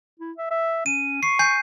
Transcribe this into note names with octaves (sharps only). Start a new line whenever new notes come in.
E4
E5
E5
C#4 D#7
C#6 C7
G#5 G6 C7